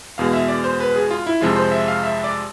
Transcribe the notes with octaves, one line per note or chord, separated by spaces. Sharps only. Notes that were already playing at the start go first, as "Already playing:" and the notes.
E2 B2 G#3 F5
E5
D5
C5
B4
G#4
F4
E4
F2 C3 F3 G#3 F4
C5
E5
F5
E5
D5